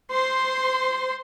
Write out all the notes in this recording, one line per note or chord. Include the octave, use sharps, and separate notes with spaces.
C5 C6